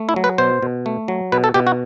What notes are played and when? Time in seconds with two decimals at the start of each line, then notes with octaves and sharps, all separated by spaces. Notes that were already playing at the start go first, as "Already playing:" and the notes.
Already playing: A3
0.09 E4
0.16 F#3
0.24 B4
0.38 B2 C5
0.63 B2
0.86 A3
1.08 F#3
1.32 B2 B4
1.44 A4
1.54 B2 G4
1.67 F#4